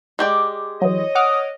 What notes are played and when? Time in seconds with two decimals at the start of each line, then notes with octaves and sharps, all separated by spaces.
0.19 G#3 G4 D5
0.82 E3 F#3 C#5 D#5
1.15 F#5 D6 D#6 F6